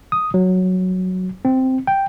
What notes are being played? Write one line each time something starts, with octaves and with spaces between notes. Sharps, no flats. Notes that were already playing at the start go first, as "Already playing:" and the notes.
D#6
F#3
C4
G5